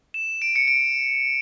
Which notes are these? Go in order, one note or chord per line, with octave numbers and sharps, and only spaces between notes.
E7
D7
C#7
D7